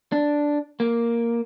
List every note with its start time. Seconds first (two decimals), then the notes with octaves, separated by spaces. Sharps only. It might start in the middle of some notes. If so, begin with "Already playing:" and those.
0.12 D4
0.80 A#3